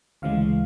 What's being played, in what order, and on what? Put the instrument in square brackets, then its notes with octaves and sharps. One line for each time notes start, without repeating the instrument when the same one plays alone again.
[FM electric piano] D2 C#3 E3 G#3 F5